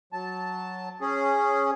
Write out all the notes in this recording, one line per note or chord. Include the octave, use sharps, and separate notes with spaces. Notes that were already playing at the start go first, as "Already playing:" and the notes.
F#3 A5
C#4 G#4